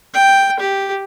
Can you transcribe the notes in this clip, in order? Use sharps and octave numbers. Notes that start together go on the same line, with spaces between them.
G5
G4